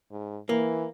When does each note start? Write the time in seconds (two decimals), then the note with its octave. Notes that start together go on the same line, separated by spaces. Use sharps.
0.11 G#2
0.49 E3 A#3